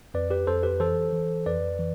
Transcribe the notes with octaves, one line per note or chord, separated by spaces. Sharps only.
F2 B4 D5
G4 B4
F2 A4 C5
G4 B4
E3 A4 C5
E3
F2 B4 D5
E3